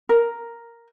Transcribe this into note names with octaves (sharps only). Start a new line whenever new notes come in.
A#4